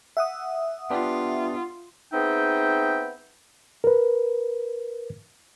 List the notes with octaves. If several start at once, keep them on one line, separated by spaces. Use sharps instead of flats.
E5 F#5 D#6
B3 D4 F4 G4
B3 C4 D#4 G#4 E5 G5
A#4 B4